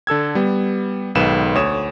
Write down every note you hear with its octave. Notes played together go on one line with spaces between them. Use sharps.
D3 A4 E6 G#6
G3 B3
B1 G#2 D#3 B4 E7
D2 C#5 D#6 E7